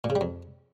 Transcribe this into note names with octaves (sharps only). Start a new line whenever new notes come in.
A#2
C#3
G3
F2